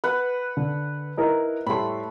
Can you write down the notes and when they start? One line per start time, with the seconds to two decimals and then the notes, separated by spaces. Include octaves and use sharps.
0.04 B4 F#5
0.57 D3
1.17 D#4 E4 A#4
1.66 A2 G3 A3 B5 C6